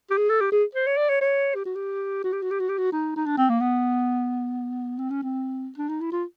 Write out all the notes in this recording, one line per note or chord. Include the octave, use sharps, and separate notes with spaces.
G4
G#4
A4
G4
G#4
C5
C#5
D5
C#5
C#5
G4
F#4
G4
F#4
G4
F#4
G4
F#4
G4
F#4
D#4
D#4
D4
C4
A#3
B3
C4
C#4
C4
D4
D#4
E4
F4